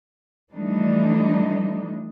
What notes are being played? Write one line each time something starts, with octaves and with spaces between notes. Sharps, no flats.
E3 F3 G3 A3 D4 D#4